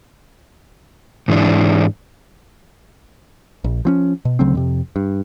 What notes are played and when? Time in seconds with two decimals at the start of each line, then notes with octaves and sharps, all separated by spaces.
1.28 G#2 E3 D4
3.64 A#1
3.85 F3 C4 C#4
4.25 B2
4.39 D2 C#3 F#3 C4
4.55 F2 C3
4.96 G2